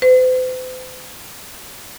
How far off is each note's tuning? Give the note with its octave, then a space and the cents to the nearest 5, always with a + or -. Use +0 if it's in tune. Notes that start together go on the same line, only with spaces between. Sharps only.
C5 -45